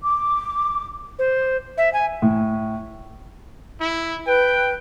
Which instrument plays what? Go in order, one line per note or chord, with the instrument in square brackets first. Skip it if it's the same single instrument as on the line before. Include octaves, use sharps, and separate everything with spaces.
[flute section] D6
[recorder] C5
E5
G#5
[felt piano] A2
[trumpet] E4
[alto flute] B4 [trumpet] G5